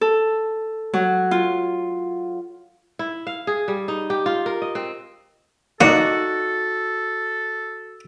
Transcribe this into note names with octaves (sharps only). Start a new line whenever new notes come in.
A4
F#3
F4
E4
F5
G#4
G3
D#4
G4
F4
A#4
D#5
C4
A#3 D#4 F#4 A4 D5 F#5